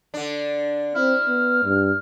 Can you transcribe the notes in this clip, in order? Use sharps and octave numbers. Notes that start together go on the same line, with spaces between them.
D3 D4
C4 E4 F6
B3
G2